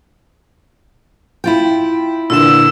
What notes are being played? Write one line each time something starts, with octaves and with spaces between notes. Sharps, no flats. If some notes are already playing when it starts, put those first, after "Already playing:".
E4 F4 G5
A#2 D3 E3 E6 E7